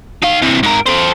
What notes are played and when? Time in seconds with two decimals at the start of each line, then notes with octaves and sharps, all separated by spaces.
0.22 D#4 F5
0.42 C3 E3
0.63 G#2 A#4
0.86 A4 C5